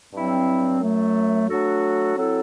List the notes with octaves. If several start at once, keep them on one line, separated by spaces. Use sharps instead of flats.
G2 F#3 C4 E4
F#2 F#3 A3
F#3 A3 D4 F#4 A4
F#3 C4 E4 A4